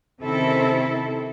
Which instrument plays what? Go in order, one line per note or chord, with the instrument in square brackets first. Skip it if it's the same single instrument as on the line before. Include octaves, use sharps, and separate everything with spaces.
[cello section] C3 D#3 C4 C#4 E4 A4